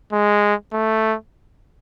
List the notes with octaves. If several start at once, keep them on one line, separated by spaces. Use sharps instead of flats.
G#3
A3